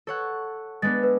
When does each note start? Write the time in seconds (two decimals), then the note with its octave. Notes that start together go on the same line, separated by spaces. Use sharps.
0.07 A4 C#5 F#5
0.82 G#3 B3 D4 A6
1.03 B4